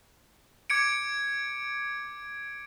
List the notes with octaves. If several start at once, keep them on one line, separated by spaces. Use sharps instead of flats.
D6 G#6 C#7 D7